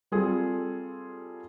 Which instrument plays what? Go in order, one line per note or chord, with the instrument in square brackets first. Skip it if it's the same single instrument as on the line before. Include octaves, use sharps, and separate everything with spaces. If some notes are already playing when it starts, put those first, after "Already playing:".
[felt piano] G3 C4 F4 G#4 A4